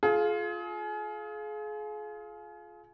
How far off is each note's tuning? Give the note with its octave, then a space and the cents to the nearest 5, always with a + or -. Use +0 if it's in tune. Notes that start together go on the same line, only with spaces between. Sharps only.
F4 +0 G#4 +35